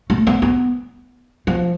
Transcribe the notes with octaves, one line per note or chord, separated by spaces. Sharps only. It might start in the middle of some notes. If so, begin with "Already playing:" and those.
A3
B3
B3
F3